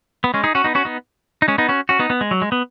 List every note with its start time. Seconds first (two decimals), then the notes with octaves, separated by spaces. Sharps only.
0.24 B3
0.34 G#3 C#4
0.44 D#4 G#4
0.55 C#4 F#4
0.64 B3 D#4
0.75 C#4 F#4
0.85 B3 D#4
1.42 D#4
1.48 G#3 C#4
1.58 B3 D#4
1.69 C#4 F#4
1.89 C#4 F#4
1.99 B3 D#4
2.10 B3
2.21 G#3
2.31 F#3
2.42 G#3
2.52 B3